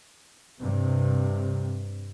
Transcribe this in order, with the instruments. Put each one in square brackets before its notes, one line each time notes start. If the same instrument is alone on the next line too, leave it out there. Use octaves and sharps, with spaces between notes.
[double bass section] G2 C3